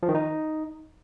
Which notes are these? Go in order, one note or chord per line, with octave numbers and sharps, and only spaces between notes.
F3
D#3
D#4